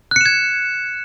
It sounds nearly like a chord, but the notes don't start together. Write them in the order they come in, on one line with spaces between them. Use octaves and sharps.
F#6 C#7 E7 G#6